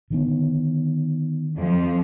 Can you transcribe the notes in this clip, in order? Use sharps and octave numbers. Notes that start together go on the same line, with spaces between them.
D3 D#3 B3
F2 F3